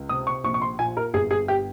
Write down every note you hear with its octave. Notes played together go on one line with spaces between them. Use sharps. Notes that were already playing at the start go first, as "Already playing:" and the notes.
Already playing: C#2
C3 D#6
C#6
A#1 C#6
C#6
C6
A#2 G#5
A#4
G1 G#4
G#4
G4